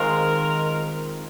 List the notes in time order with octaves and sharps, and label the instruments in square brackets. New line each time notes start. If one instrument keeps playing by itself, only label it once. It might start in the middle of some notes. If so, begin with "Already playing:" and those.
Already playing: [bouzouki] D#3 G#3 C4 F4 [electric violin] A#4